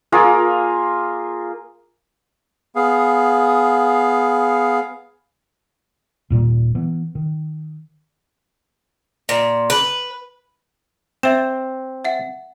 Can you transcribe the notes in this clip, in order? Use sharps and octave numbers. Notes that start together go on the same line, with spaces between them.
A#3 F4 G#4 A#4
B3 G#4 F5
D#1 A#2 G3
E3 B3
D#3
A#2
B4
C4 E5 E7
E5 F#5